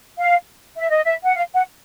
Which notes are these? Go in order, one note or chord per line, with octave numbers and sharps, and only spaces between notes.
F5
E5
D#5
E5
F#5
F5
F#5